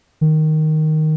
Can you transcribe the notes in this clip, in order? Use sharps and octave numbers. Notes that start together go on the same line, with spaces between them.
D#3